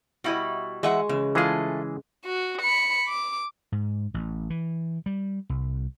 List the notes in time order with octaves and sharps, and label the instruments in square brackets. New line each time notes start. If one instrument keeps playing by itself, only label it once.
[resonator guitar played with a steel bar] B2 G3 E4 [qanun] F#4 D#5
[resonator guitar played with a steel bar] E3 E5 F#5 [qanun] G#3 D#5 C#6
[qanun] C#3 [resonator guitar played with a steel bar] E3
[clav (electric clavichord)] E3 G#3 G#4 [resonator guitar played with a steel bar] A3 F4
[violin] F#4
B5 C#7
D6
[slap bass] G#2
A1
E3
G3
C2